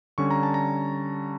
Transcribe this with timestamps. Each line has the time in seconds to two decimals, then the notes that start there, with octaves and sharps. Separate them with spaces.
0.18 D3 G3 C#4 C#6
0.31 A#5
0.43 A5
0.54 A#5